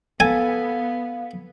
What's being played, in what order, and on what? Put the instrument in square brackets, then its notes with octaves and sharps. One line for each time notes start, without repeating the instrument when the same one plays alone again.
[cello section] B3 [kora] A4 [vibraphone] F5 [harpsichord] G#5